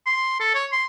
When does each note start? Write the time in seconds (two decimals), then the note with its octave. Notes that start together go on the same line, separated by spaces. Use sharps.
0.06 C6
0.40 A4
0.55 C#5
0.72 C6